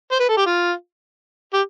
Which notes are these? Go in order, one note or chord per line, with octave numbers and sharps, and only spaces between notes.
C5
B4
A4
G4
F4
G4